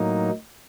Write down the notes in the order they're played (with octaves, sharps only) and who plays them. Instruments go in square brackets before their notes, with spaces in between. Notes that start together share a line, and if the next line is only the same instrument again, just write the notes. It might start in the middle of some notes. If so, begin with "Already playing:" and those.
Already playing: [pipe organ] A2 F#3 A#3 D#4